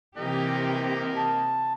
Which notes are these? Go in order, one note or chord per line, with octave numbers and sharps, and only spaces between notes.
C3 E3 A#3 D#4 G4 A#4
A5